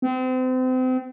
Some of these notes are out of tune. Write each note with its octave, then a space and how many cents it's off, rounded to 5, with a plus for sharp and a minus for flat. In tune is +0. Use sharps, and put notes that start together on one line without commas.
C4 -35